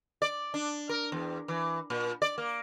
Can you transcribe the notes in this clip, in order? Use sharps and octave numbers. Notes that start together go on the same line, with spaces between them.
D5
D4
A#4
E2
E3
A#2
D5
A#3